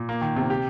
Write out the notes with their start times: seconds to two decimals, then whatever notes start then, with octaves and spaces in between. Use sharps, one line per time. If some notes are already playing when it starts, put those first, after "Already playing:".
Already playing: A#2
0.09 A#3
0.21 D#3
0.36 C3
0.50 G4